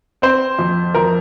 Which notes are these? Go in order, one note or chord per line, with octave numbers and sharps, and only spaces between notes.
C4 C5
F2
F2 A#4